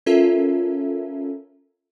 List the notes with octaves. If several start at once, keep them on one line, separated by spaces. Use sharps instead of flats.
C#4 F4 A4 A#4 E5